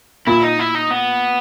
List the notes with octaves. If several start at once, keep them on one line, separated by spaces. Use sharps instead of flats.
A#2 E4
D#4
E4
D#4
B3